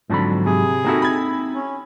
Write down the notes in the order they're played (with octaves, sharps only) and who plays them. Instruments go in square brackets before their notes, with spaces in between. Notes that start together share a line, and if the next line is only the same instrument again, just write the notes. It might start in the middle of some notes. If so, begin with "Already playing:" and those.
[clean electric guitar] G#2 F#3 B5 [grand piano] D3 F3 C4
[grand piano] C3 [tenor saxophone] G#4
[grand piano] A#3 F#4 A4 [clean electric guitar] C4 D#4 E4
[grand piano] B5 G#6
[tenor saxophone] C#4